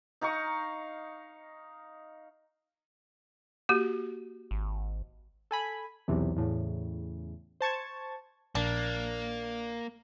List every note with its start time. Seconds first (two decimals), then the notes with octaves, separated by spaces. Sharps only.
0.21 D#4 F5 A#5 C#6
3.69 A#3 F#4 G4
4.51 G#1
5.51 A4 G#5 B5
6.08 B1 E2 C3 E3
6.36 E2 A2 C#3
7.61 C5 A5 C#6 G#6
8.55 A#1 A#3 D4